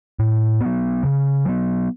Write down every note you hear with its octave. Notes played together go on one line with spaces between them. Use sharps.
A2
F#3 B3
C#3
F#3 B3